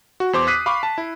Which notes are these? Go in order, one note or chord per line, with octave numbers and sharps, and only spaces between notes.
F#4
E2 C5 D6
D6 D#6 F#6 B6 C7 D#7
F5 B5 C#6 D6
A5
E4